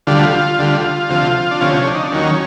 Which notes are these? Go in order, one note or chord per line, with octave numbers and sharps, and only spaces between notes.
D2 D3 G3 F4
D2 D3 G3
D2 C3 F3
D4
D2 C3 F3 C#4
D4
D#4
D4
D#2 D#3 F#3 C#4